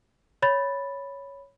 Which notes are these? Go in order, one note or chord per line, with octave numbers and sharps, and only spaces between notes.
C#5 B5 A6